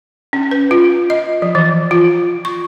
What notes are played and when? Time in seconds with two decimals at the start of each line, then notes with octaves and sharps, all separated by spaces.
0.33 C#4
0.51 B4
0.71 F4
1.10 D#5
1.42 F3
1.55 E3
1.91 F4
2.45 C#6